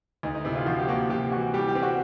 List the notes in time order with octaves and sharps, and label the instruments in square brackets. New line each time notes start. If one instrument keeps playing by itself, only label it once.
[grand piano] D2 [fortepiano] D#4
[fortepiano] D#4
[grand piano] C3 [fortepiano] E4
[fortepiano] F4
[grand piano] F3 [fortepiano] F#4
[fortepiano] G4
[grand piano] A#3 [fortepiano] F#4
[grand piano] C3 [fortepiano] G4
[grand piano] E3 [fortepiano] F#4
[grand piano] G3 [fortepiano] G4
[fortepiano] G4
[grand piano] C4
[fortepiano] F#4